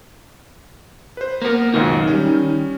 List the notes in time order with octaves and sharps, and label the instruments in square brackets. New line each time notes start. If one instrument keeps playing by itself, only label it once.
[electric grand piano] B4 C5
[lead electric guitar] A#3 B3 [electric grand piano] A#4 C5
[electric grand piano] C#2 F#2 B2 [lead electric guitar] D#3
[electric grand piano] G3 C#4